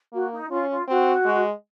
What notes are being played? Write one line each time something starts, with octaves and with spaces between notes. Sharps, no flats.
A#3 F#4
D#4
C#4 F4
F4
C4 F#4
G#3